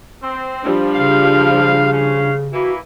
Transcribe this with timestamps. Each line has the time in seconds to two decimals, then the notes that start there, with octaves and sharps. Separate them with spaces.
0.22 C4
0.63 F3 G3 D4
0.94 C#3 F5
1.92 C#4 F5
2.53 E3 A#3 E4 F#4